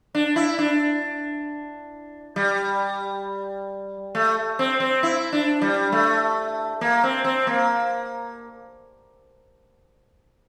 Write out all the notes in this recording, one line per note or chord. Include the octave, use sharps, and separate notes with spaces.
D4
E4
D4
G3
A3
C4
C4
E4
D4
G3
A3
A#3
C4
C4
A#3